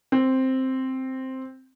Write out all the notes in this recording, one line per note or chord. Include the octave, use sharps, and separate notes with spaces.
C4